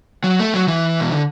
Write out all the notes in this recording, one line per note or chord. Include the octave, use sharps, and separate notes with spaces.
F#3
A3
F#3
E3
B2
D3